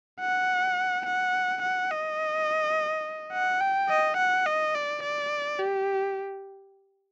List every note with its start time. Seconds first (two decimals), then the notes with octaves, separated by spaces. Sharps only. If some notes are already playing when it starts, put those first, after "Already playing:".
0.20 F#5
1.06 F#5
1.62 F#5
1.90 D#5
3.33 F#5
3.61 G5
3.89 D#5
4.17 F#5
4.46 D#5
4.75 D5
5.03 D5
5.59 G4